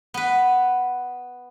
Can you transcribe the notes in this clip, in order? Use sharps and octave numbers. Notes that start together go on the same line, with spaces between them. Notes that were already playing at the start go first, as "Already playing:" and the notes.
B3 B4